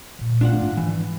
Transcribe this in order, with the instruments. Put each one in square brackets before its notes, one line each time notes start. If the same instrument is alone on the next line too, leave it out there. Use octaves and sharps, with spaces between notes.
[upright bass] A#2
[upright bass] A3 [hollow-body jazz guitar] D4 F4 F#5
[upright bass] G#2
[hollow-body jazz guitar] E3